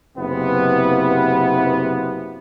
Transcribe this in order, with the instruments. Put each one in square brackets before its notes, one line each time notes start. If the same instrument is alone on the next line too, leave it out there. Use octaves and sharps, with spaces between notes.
[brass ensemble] F#1 C3 B3